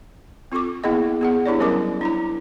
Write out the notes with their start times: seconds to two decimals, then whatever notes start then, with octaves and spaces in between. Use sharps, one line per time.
0.52 C4 F4 A4 C#6 D6
0.83 A#3 B3 E4 G#4 D#5 G5
1.21 B3 G#4 F#5
1.46 D4 E4 G4 C#5 D5
1.59 F#3 G3 C#4 A#4 D#5 D6
2.01 D4 E4 A#5